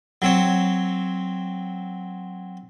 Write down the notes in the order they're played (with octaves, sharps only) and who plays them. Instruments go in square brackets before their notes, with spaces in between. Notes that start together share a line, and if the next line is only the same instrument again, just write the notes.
[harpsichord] F#3 C4 C#5